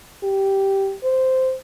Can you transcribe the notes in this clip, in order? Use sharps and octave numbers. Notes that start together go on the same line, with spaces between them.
G4
C5